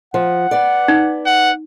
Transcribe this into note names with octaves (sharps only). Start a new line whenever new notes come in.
F3 F#5
B3 D5
D#4
F#5